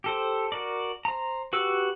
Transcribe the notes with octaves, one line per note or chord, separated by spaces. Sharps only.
G4 A4 C5
F#4 A#4 D5
C5 A#5
F#4 G4 B4 E6